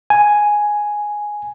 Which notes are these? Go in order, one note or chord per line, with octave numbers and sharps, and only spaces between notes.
G#5